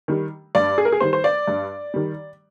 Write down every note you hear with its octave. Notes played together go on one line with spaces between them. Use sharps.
D#3 G3
G2 D5
G#4
A#4
G#4
D#3 G3 C5
C5
D5
G2
D#3 G3